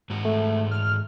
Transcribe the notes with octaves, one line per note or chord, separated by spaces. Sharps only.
G#2 F#4
A3
F6